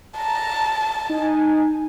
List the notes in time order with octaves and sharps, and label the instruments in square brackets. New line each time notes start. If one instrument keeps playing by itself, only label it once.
[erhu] A5 [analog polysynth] A#5
[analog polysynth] D#4 G#5